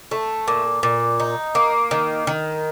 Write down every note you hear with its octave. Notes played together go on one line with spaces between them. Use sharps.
A3
A#2
A#2
D#4
A#3
D#3
D#3